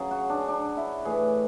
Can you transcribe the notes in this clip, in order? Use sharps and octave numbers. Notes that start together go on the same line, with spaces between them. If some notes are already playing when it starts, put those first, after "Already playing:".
Already playing: C#3 F#3 G#4
F#4
D4
D4
E4
A2 E3 G#4